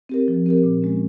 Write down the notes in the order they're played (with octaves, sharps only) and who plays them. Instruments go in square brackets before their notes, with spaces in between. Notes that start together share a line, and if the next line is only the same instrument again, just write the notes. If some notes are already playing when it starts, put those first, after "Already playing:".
[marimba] C4 G4 A#4
F3
C4 G4 A#4
A#2
G#3 C#4